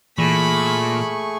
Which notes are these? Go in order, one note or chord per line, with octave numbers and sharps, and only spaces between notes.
A#2 E3 A3 G#4 B5 C#6